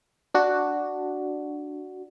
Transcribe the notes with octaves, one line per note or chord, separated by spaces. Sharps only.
D4 F#4